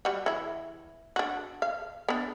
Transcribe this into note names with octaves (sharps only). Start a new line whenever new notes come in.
G3 F#4
E3 E4
D4 F#4
F5
B3 D4